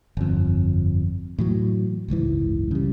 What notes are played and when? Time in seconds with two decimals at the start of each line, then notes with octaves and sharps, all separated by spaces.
0.17 G1 F2
1.39 A2 E3 F#3
2.08 F#1 C#2 G#2 E3
2.71 C#3 G3